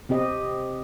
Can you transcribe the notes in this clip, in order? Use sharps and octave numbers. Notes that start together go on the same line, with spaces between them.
C3 C4 G4 D#5